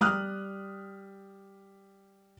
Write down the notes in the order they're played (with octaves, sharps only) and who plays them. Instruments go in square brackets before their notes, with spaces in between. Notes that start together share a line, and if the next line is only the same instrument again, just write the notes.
[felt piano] G3 D#6 F6 F#6